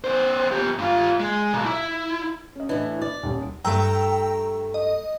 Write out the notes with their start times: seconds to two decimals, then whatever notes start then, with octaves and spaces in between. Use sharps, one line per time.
0.04 B3 C5
0.51 B3 G4
0.78 G2 F4
1.20 G#3
1.54 B1
1.65 E4
2.55 C#4 D#5
2.69 A2 E3 D4 B4
3.01 D5
3.23 D#1 D#2
3.65 G2 A3 G5 A#5 E6
4.74 D#5